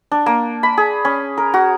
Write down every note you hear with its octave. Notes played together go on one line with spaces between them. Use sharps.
D4
A#3
B5
G#4
C#4
A#4
F#4